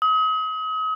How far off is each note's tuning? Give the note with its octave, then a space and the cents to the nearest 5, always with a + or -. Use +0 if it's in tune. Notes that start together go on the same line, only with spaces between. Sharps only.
D#6 +40